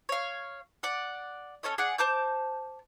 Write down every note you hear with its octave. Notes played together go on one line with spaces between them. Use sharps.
C#5 F5
D5 F#5
C#4 A4 C#5 D#5
G#4 D5 F#5
C5 A5 D6 G6